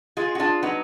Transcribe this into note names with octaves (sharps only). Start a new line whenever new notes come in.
G#3 F4 G#4
F#4
D4 F4
F#3 B3 D#4